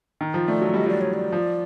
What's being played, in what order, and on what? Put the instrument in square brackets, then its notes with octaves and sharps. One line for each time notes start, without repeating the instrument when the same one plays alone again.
[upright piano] D#3
F3
[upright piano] A3 [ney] D5
[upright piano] F#3
[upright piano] G3 [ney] D#5
[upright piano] F#3 [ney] D5
[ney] C#5
D5
[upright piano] F3